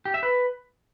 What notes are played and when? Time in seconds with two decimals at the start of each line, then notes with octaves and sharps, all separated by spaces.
0.05 G4
0.14 E5
0.23 B4